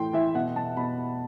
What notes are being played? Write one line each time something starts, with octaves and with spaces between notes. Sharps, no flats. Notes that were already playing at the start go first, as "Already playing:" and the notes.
Already playing: A2 E3 G5 C6
E3 E5
B2 F#5
B2 A5
B2 B5